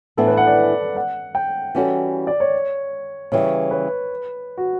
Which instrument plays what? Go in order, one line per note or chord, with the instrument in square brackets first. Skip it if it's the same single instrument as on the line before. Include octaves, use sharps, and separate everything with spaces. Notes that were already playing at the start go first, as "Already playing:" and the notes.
[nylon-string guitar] A2 E3 B3 D4 [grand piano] A4
[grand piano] B4
F#5
D5
F#5
G5
[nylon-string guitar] E3 G3 C#4 F#4 A4
[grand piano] D5
C#5
[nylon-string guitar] C#3 E3 G3 [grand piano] C#5
[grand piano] B4
F#4